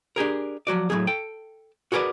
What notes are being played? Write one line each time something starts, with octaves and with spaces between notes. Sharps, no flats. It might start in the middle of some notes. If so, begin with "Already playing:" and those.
D4 G4 G#4 A#4
F3 F#3 F#4 D5
A2 F#3 A#3 G#4
A4 G5
F#4 G#4 A#4 B4 D5